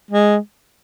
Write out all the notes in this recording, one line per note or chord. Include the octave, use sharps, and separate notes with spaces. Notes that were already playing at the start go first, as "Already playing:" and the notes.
G#3